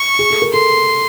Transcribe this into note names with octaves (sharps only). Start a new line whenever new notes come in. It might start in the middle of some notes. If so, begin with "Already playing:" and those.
Already playing: C#6
G#4
A4
A#4
A4 C6